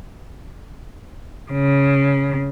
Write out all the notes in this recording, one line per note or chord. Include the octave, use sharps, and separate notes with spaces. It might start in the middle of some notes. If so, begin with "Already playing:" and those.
C#3